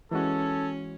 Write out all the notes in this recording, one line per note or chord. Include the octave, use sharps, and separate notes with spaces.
E3 G#3 C#4 F#4 A4